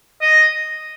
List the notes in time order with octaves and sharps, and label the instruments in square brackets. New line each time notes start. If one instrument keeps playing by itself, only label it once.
[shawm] D#5